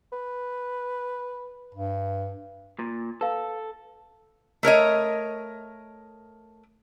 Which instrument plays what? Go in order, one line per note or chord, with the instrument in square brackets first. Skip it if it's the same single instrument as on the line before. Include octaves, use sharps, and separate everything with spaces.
[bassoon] B4
[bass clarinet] G2
[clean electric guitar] A#2
[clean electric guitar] A4 [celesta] B4 F5
[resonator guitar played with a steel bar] A3 A#4 C#5 D#5